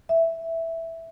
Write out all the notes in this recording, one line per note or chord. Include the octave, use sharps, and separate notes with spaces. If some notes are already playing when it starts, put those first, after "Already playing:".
E5